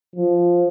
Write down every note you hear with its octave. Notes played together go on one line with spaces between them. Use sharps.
F3